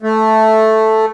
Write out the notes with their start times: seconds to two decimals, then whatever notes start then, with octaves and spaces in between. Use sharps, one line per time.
0.03 A3